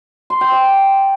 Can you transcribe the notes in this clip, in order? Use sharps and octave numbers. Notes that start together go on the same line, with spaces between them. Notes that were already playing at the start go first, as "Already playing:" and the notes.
C6
G5
D5